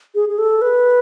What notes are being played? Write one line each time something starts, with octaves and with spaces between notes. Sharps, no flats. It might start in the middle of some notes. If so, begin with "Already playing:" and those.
G#4
G#4
A4
B4